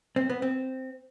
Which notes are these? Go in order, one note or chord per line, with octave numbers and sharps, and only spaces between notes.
C4
B3
C4